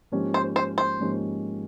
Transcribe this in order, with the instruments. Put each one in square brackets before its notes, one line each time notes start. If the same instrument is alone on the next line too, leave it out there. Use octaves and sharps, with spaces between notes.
[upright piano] G#2 F3 A#3 C#4 G4
[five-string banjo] C5
C5
C5
[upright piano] G#2 F3 A#3 C#4 G4